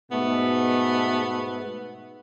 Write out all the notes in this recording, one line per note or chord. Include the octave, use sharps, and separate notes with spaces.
G#2 B2 A3 B3